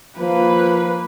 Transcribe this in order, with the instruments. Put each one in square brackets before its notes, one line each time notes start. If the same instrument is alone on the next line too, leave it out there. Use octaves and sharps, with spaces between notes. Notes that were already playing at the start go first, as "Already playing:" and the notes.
[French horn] F3 [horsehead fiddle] A#3 B4